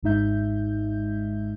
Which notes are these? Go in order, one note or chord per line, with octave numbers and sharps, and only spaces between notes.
G#1 G#2 G#3 D#4 E5 G6